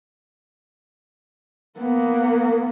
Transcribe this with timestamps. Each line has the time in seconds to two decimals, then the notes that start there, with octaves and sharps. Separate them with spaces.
1.79 A#3 B3